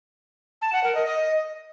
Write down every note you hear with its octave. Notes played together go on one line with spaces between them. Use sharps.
A5
F#5
A#4
D#5
D#5